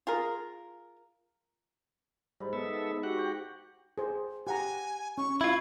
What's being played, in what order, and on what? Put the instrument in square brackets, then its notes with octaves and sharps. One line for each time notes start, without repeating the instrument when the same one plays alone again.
[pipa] F4 G#4 A#4
[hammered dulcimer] G#2 B5 [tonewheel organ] G3
[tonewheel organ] B3 A4 E5
F#4 G4 F#5
[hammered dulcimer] G5 C#6
[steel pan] G#4 C5
[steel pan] G4 F#5 A#5 [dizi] G#5
[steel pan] C#4 [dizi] C#6
[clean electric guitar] E4 F4 [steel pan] C#6 [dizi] G#6